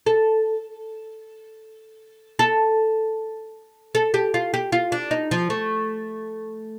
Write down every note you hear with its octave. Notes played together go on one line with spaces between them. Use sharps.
A4
A4
A4
G4
F4
G4
F4
D4
D#4
F3
A3